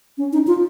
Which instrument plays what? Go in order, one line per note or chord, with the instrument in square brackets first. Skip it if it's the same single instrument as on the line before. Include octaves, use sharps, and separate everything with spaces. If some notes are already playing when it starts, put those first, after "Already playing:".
[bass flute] C#4
D#4
F4